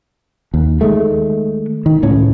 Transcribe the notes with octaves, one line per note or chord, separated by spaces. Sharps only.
D#2
D#3 G#3 A3
D#3
C#2 A2 C#4